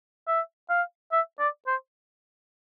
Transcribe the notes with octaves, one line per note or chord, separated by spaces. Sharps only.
E5
F5
E5
D5
C5